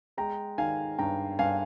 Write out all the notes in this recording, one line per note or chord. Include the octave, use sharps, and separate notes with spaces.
G#3 G5 A#5
D#3 F5 G#5
G2 G5 A#5
G2 F5 G#5